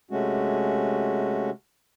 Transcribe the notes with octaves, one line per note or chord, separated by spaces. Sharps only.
C3 G#3 A3 C#4 F#4